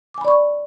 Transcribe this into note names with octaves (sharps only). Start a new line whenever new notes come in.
D5 G#5 B5 C#6 D6